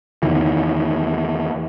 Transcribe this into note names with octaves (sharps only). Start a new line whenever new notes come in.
E2 D#3 E3